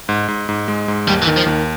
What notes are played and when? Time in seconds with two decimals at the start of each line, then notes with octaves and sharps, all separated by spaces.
0.09 G#2
0.28 G#2
0.49 G#2
0.68 G#3
0.88 G#2
1.07 D#2 G3
1.22 E3
1.27 D#3
1.37 F3
1.46 D#2